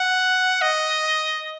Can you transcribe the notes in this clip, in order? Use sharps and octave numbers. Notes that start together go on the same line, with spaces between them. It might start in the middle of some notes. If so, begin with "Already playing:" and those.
Already playing: F#5
D#5